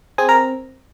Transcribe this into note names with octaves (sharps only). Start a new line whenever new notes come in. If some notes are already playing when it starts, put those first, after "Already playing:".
C4 G#4 G#5
A#4 A#5